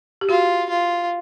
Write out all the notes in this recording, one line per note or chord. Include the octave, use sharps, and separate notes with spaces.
G4
F4 F#4
F4